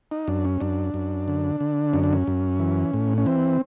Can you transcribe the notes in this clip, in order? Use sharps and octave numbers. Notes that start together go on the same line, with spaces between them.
D#4
F#2 D4
C#4
F#2 D4
F#2
D3
D3
F#2 C#4
D4
C#4
F#2
E3
A2
C#4
E3 C4